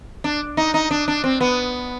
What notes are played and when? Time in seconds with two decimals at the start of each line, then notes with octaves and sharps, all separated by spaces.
0.24 D4
0.57 D#4
0.74 D#4
0.91 D4
1.08 D4
1.24 C4
1.41 B3